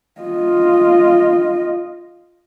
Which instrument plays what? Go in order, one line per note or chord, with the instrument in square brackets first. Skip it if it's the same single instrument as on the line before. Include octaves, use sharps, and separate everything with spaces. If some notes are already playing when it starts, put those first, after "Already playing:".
[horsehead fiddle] F4 D#5